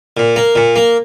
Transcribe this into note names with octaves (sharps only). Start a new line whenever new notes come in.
A#2
A#3
A#2
A#3